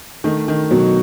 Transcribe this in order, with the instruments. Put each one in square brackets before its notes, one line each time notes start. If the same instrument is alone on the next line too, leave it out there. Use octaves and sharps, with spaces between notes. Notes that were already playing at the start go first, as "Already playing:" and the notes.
[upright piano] D#3 [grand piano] A3
[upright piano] D#3
[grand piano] B2 [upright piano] F#3